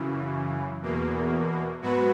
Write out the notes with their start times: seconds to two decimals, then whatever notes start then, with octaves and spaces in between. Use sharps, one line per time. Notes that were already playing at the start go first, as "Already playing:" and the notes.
Already playing: F#2 C#3 E3
0.82 E2 B2 A#3
1.82 G#2 F#3 B3 F#4 B4